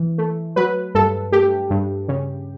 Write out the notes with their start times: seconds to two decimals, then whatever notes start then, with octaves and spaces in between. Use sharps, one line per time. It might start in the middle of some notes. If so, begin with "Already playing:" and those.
Already playing: E3
0.18 A3
0.56 F#3 B4
0.95 G2 A4
1.32 A3 G4
1.70 G2
2.08 C#3